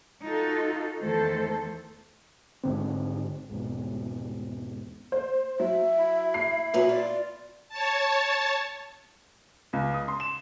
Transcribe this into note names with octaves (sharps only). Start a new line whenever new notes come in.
D#4 F4 F#4 A4
E2 D#3 A3 A4 C5
G#1 G#2 D3 C4
G#1 E2 B2
C5
F#3 E5
E4
C7
A#2 F#3 B3 E5
F4 D5
C#5 A5
C#2
D#6
C6
E7